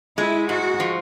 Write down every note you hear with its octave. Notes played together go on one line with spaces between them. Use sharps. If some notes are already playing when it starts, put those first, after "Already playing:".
G#3 E4
G#2 F#4
F3